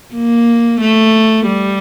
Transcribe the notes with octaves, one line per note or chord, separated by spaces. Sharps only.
A#3
A3
G3